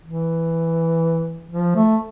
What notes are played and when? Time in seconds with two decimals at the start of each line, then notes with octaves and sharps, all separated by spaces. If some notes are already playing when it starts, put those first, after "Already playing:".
0.04 E3
1.51 F3
1.76 A3